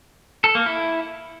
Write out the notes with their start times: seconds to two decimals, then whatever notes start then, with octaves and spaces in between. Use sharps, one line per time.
0.44 A4
0.55 A#3
0.66 E4